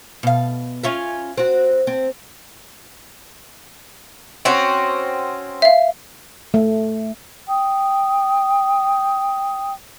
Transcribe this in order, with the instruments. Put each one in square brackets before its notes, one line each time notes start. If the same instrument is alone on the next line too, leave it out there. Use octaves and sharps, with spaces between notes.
[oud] B2 F5
C#4 F4 E5
C4 F#4
C4
[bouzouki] C4 C#4 F#4
[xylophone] E5 F5
[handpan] A3
[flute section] G5 D#6